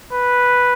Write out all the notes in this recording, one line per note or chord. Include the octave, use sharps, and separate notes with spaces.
B4